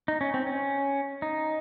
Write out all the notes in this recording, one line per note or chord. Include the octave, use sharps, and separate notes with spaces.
D#4
C#4
C4
C#4
D#4